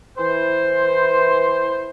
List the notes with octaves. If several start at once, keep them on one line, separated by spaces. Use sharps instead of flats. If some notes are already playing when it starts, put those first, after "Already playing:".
E3 C5